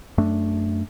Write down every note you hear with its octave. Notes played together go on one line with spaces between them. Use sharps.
F#2 A3 D4